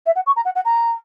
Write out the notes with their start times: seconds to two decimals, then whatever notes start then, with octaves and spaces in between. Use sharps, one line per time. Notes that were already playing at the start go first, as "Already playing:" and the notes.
0.06 E5
0.16 F#5
0.27 C#6
0.36 A#5
0.45 F#5
0.56 F#5
0.65 A#5